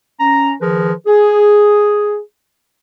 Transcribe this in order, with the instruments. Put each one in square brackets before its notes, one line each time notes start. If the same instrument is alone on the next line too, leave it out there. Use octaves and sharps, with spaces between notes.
[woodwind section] C#4 A#5
D#3 F3 G#4 A#4 B4
G#4